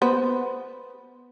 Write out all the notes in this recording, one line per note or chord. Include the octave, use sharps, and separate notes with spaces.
B3 B4 C5